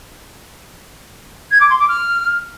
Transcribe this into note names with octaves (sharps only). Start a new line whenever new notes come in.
G#6
D6
C6
D6
F6